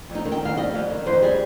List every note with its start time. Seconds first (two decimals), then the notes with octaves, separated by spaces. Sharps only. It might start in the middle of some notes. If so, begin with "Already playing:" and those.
0.10 F2
0.15 D#4
0.25 D#3
0.32 G5
0.42 F2 F5
0.57 G3 D#5
0.74 F2 F5
0.90 D#3
1.06 F2 C5
1.22 G3 G#4